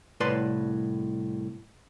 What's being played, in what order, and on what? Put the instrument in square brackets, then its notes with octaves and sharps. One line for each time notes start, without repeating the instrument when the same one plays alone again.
[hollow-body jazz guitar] C2 A2 B4 D5 C6